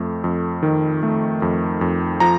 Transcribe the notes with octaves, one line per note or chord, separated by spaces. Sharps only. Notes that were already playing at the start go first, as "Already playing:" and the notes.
Already playing: F2 A3
F2
D#3
A3
F2
F2
F3 A#5